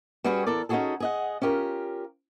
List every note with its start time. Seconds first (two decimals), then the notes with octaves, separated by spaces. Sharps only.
0.24 G3 C#4 F#4 G#4 B4 C#5
0.46 E2 A4 A#4 D5
0.69 C#4 D#4 F4 F#4 G#4 A4
1.00 G#4 D#5 F#5
1.42 C#4 F4 G4 A#4